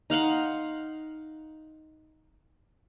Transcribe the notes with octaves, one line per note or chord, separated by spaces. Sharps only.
D#4 F5 F#5 C6